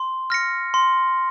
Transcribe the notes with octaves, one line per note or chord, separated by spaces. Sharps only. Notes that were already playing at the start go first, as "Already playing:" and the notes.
Already playing: C6
F6 A#6 C#7
C6